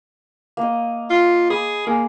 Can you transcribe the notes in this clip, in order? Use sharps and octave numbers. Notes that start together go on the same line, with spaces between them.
A#3 D#5
F4
G#4 B5
A#3 G#4